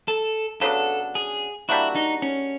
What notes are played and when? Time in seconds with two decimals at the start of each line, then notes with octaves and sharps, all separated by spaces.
0.08 A4
0.61 C#3 F#3 B3 D4 A4
1.15 G#4
1.69 G3 A#3 D4 E4 F#4
1.95 D#4
2.22 C#4